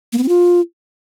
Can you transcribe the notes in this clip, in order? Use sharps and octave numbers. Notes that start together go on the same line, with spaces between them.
A#3
B3
C4
F4